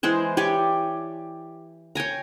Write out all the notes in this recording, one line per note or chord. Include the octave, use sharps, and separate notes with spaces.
E3 G#3 G#4 C5
G4 C#5 D5 G#5
C#5 G5 G#5 A#5